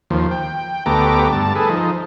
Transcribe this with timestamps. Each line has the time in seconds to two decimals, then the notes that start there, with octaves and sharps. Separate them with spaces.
0.10 D#2 F3
0.31 G5
0.86 D2 A3 B3 G4 A#5 D6
1.33 G2 A5
1.55 G#4 A4 B4
1.70 F3 D#4